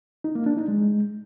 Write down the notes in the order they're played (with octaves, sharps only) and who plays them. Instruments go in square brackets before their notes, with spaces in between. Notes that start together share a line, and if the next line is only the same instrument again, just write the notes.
[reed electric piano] D#4
A#3
D4
D#4
G#3